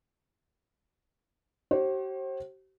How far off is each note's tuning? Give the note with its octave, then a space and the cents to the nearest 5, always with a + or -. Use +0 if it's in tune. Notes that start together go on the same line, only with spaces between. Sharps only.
G4 -45 C5 +35